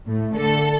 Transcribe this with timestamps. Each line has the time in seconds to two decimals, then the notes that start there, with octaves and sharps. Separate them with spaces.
0.09 A2 A3
0.36 D3 A3 A4